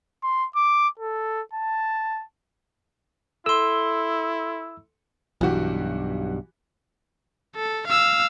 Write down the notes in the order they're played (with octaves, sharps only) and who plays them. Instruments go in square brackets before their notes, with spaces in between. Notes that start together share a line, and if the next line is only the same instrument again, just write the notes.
[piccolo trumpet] C6
D6
A4
A5
[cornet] E4 [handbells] A4 C6 [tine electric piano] E6
[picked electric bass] B1 G2 [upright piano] E3 F#4 G4
[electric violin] A4
F5 E6